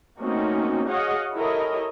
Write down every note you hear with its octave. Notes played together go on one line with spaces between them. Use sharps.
A3 A#3 C4 C#4 D#4 F#4
F#4 G#4 C#5 D#5 F5 F#5
E4 G4 A4 A#4 C#5 D#5